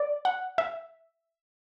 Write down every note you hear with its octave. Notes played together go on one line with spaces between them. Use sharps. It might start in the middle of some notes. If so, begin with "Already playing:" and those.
Already playing: D5
F#5
E5